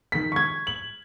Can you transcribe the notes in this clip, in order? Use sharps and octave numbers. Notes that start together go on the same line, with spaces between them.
D#3 B6
C#6 G#6
F#7